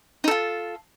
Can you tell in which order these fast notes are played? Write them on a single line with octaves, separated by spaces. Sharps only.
D#4 A4 F4